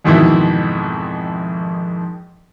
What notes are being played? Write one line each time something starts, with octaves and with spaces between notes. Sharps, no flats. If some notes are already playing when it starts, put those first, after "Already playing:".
F2 G#2 B2 D#3 E3 E4